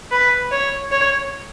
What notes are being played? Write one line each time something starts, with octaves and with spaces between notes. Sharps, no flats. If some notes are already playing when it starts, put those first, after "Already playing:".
B4
C#5
C#5